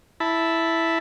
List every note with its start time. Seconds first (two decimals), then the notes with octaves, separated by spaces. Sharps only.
0.20 E4 A5 B5